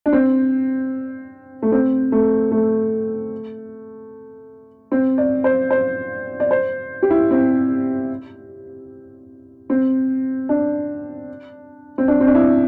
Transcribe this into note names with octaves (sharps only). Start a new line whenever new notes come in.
D4
C4
A3
C4
A3
A3
C4
D5
C5
C5
D5
C5
G4
E4
C4
C4
D4
C4
D4
C4
D4
E4